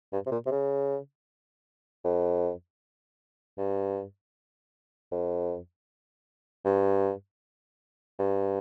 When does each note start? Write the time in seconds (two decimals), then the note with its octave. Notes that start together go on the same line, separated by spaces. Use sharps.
0.13 G2
0.26 C3
0.31 A#2
0.46 C3
0.51 C#3
2.05 F2
3.58 G2
5.12 F2
6.65 G2
8.19 G2